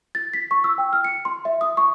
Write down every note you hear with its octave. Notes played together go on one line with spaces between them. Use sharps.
A6
B6
C#6
E6
G5
F6
C#7
C6
E5
D#6
C#6